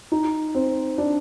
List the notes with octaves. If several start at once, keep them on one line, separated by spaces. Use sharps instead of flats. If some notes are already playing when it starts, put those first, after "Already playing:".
D#4
C4
D4